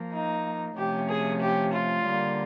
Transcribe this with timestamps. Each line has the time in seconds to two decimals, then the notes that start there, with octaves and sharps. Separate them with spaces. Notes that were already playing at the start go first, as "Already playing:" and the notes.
Already playing: F3 A#3
0.12 D#4
0.76 C3 F3 A3 C#4 G4
1.09 G#4
1.41 G4
1.73 F4
2.05 D3 G3 A#3